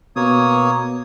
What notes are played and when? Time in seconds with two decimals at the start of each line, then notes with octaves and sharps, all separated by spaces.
0.16 B2 A#3 C#5 D#6